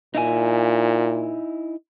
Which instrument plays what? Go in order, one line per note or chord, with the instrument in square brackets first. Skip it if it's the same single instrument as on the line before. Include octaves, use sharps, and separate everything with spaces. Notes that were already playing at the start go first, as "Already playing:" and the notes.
[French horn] A#2 [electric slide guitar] D#4 E4 G#5